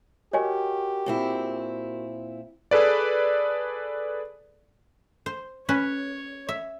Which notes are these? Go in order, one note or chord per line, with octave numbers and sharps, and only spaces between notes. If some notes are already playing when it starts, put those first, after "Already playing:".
F#4 G4 A#4 C#5 D#5 G#5
A#2 C4 E4
G#4 A4 B4 D5
C5
C#4 B4 C#5
E5